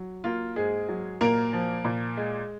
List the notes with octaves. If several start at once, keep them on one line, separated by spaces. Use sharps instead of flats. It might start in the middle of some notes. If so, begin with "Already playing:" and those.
Already playing: F#3
A#3 F4
G#2 G#3 G#4
F#3
A#2 A#3 A#4
F3
A#2
G#3